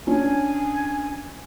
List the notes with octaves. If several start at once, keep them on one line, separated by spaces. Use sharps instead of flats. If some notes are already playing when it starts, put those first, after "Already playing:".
C#4 D4 C#5 G#5